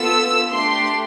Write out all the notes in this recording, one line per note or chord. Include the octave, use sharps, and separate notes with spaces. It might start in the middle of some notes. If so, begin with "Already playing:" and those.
Already playing: B3 F4 A4 E6
A3 D4 G4 C6